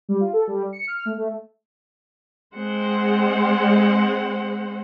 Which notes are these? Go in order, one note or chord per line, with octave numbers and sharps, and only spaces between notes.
G3
F4
A4
G3
C#7
F6
A3
A3
G#3 C4 C5 F#5